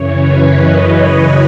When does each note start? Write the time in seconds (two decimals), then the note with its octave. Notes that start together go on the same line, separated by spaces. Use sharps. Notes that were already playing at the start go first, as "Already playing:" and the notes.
Already playing: F#2 C#3 E3 C#5
0.18 B4
0.55 D#5